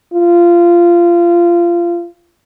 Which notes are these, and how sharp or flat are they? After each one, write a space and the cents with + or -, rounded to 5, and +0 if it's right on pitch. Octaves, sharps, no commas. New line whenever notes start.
F4 -20